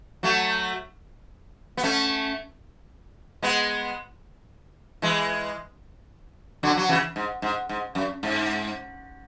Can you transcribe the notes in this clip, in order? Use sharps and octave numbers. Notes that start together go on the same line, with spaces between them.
F#3 A3
B3
A3 C#4
G#3 B3
E3 G#3
D3 F#3
F#3
C#3 E3
G#2
G#2
G#2
F#2
G#2